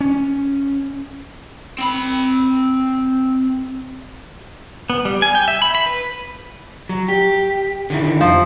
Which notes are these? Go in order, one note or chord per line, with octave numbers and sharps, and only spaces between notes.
C#4
C4 B5
B3
G3
G#5
G5
E5
B5
B5
B4
F#3
G4
D3 D#3 E4
F2 F3